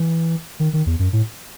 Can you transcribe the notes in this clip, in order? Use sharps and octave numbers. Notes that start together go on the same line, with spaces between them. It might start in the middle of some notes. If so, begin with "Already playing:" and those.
Already playing: E3
D#3
D#3
E2
F#2
A2